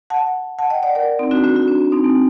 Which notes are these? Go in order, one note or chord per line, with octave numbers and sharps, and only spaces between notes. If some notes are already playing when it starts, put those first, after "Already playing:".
F#5 A5
F#5 A5
D#5 G5
D5 F#5
A#4 D5
C4 D#4
D4 F#4
D4 F#4
D4 F#4
D4
D4
C4 D#4
C4